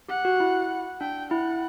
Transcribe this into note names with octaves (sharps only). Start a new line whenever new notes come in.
G4 F#5
F#4
E4
D4 G5
E4 F#5